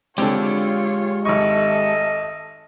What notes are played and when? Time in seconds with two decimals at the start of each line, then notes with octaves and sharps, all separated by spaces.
0.18 D3 G#3 C4 F4 G4 C#5 D5
1.25 G#1 A4 D#5 E5 C#6